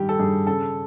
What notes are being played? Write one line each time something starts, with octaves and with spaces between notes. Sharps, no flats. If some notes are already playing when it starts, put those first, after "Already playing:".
Already playing: G2 D#3 G3 G4
A4
G2 G#4
C#3 A4